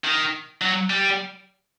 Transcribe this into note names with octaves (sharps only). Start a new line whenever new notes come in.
D#3
F#3
G3